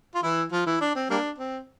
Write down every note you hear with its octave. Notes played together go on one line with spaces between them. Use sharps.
F4
E3 E4
F3 F4
E3 E4
D4
C4
G3 A#3 D4
C4